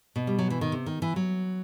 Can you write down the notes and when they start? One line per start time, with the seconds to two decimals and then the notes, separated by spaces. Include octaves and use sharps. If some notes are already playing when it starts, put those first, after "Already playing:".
0.16 B2
0.27 G3
0.39 F#3
0.50 E3
0.61 D#3
0.72 C3
0.86 D#3
1.02 E3
1.16 F#3